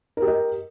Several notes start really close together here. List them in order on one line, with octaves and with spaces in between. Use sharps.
A#4 G4 D#5